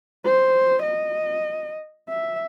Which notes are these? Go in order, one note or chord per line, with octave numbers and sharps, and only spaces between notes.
C5
D#5
E5